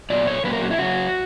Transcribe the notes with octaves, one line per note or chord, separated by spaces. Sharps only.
A#2 F#3 B3 D5
C#5
A#2 F#3 A#3 C#4 B4
A#4
F#4
E4
C#3 F#3 C#4 F#4